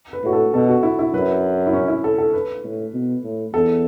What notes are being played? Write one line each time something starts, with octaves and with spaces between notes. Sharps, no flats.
B4
A2 F#4
A4
B2 A4
F#4
E4
E4
F#2 B4
E4
C#4
E4
A4
A4
B4
A2
B2
A2
E2 A4